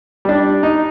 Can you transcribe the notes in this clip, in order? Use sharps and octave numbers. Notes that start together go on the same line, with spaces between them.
G3 D4
D#4